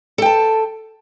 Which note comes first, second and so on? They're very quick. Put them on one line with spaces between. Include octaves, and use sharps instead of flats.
A4 G5 A5